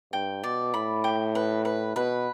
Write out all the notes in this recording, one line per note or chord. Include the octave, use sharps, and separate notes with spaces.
G2 G5
B2 D5
A2 B5
G5
B4
B4
B2 B4